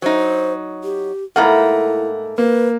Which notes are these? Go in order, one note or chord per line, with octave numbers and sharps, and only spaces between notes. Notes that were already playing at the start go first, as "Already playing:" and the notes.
F#3 D#4 C5
G4
G#2 A3 A#3 E4 F#5 A#5 B5
A#3 B4